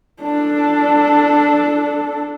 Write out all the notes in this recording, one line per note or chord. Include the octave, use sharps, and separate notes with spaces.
D4 A4